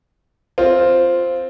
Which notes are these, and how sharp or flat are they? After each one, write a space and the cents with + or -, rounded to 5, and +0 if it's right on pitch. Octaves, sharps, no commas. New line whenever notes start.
C4 +0 F4 +0